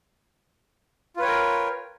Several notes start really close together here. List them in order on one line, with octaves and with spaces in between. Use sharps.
F4 B4 C#5 G5 A#4